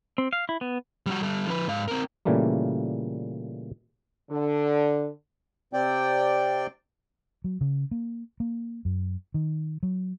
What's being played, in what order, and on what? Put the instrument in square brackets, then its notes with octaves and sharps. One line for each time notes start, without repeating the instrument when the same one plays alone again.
[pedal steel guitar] C4
F5
E4
B3
[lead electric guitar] G3 F#4
G3 A4
F3 B4
G#2 F5
C4 A#4
[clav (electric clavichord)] A#2 C#3 E3 G3 A3 A#3
[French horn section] D3
[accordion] C3 C4 D5 G5
[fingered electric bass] F#3
C#3
A#3
A#3
F#2
D#3
F#3